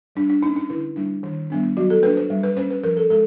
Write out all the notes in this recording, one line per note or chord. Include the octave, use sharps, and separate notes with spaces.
G3 D4
D4
A#3 C#4 D#4
D#4
D3 E4
G3 A#3 D4
D#3
G3 B3 D4
F#3 F#4
A4
A#3 D4 B4
C5
G3
B4
A#3 C#4 C5
B4
F3 A#4
A4
G#3 A4